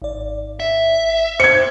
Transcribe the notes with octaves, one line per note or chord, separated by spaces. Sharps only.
G#1 D5
E5
C5 G#6 C#7